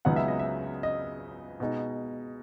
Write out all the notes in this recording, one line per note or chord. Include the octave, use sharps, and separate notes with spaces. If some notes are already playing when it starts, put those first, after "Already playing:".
C#2 C#3 F#3 B3 D#4 F#5
E5
D#5
E5
D#5
B2 G#3 D#4